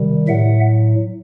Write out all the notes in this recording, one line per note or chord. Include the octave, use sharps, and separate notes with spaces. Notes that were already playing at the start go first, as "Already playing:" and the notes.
Already playing: C3 D#3 G3
A2 F#3 E5 F#5